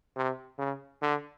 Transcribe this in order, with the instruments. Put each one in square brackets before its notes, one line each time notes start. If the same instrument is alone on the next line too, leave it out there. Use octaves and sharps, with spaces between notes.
[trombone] C3
C#3
D3